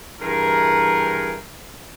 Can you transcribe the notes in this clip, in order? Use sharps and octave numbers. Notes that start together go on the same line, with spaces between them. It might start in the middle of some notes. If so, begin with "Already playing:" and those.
G2 E3 G#4 A#4